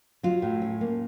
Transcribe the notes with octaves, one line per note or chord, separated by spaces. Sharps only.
F#3 F4
A2
C#4
A#3